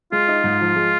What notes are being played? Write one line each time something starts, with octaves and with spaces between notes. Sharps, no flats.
G#3 F4
D#4
G#2
F3
G#3